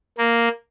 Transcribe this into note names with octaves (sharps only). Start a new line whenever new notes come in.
A#3